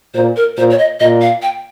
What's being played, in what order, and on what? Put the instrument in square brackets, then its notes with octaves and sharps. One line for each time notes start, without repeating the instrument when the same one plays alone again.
[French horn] A#2 [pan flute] C5
[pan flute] A#4
[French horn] A#2 [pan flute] C5
[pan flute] C#5
D#5
[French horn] A#2 [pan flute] D#5
[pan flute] F5
G5